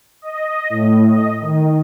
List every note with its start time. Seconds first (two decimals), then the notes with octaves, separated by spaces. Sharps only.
0.22 D#5
0.70 A2
1.09 D#5
1.41 D#3